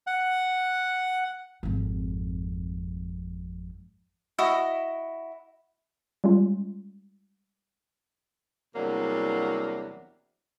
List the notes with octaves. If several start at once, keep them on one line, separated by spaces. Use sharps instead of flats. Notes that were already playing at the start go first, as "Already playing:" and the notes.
F#5
G#1 F2
E4 F#4 D#5
G3 G#3 C#4 F4
E2 C3 F#3 G3 A#3 D4